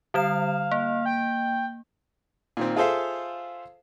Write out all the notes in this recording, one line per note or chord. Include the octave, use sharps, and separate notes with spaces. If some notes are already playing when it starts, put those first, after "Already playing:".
D3 G3 F5 E7
A#3
G5
A#2 D#3 C4
F4 G#4 A4 C5 E5 F5